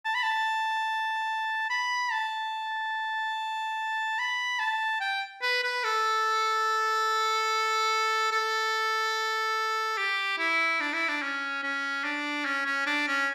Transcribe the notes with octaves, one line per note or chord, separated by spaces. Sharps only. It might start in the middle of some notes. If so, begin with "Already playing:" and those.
A5
B5
A5
B5
A5
B5
A5
G5
B4
B4
A4
A4
G4
E4
D4
E4
D4
C#4
C#4
D4
C#4
C#4
D4
C#4